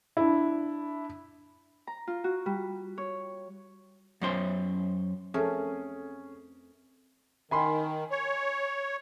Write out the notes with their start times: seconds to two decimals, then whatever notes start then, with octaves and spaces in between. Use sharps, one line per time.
0.17 D4 E4
1.87 A#5
2.08 F4
2.24 F#4
2.46 G3
2.98 C#5
4.21 F#2 C#4 C5
5.34 F2 A3 C#4 G#4 A#4
7.51 D#3 G#5 B5 C6
8.11 C#5